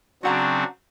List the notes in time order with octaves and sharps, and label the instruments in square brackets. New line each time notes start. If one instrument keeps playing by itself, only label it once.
[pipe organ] C#3 F#3 C4 [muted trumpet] D4 [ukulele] F#4 F#5 A#5